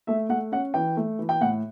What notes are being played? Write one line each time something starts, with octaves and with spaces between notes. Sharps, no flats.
A3 E5
A3 F#5
C#4 F#5
E3 G5
A3
E3
G5
A2 F#5